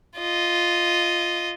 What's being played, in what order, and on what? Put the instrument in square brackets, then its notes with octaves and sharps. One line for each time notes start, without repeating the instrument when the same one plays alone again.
[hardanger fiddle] F4 D#5